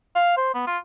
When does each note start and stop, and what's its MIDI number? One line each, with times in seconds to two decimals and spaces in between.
0.15 0.35 77
0.37 0.52 72
0.54 0.64 59
0.66 0.78 65